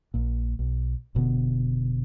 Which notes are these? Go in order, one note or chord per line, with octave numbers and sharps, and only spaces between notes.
A#1 A#2
B1
F1 B2 D3 B3